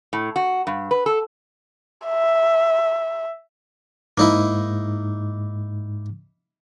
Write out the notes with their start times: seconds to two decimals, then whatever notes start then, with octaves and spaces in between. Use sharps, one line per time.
0.13 A2
0.36 F#4
0.67 G2
0.91 B4
1.06 A4
2.07 E5
4.18 G#2 A#3 D#4 E4